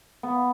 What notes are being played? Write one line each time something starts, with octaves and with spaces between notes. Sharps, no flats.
B3